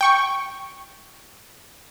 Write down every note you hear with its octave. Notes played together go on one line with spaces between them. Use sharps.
G5 C#6